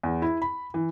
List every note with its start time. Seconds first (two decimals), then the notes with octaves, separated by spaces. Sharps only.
0.03 E2
0.22 E4
0.42 B5
0.74 E3